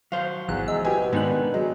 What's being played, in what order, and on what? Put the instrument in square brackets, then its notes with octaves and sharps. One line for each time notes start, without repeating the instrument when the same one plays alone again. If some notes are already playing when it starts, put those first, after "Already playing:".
[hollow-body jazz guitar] F#3 C5 [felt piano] F5
[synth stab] G#1 F#5 [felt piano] E2
[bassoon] G#3 [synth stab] E5
[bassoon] B2 [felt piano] G4 G#5
[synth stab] G#2 D#3 F#6 [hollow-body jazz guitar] B3 D4
[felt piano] F#3 [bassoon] G#3